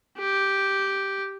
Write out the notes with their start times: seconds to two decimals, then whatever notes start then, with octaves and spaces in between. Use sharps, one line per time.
0.18 G4